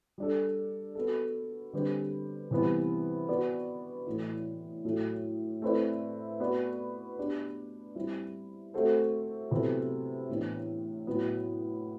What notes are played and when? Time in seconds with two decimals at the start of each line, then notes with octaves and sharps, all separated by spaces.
0.18 G3 D4 A4
0.95 B3 F#4 A4
1.73 D3 G3 C4 G4 B4
2.51 C3 E3 G3 B3
3.28 B3 F#4 B4 D5
4.06 A2 E3 A3 E4
4.85 A2 F#3 A3
5.62 A3 C4 E4 B4 D5
6.40 B3 F#4 B4 D5
7.18 B3 D4 G4
7.95 G3 C4 E4
8.74 A3 C4 F#4 A4 C5
9.51 C3 F#3 B3 E4 A4
10.29 A2 E3 B3 D4
11.07 A2 F#3 B3